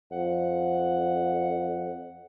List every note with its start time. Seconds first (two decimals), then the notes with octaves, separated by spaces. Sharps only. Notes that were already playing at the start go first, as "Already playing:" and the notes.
0.12 F2 F#5